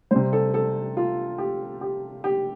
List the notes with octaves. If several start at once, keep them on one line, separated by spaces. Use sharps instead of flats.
C3 G3 C5
A4
A4
F4
G4
G4
G4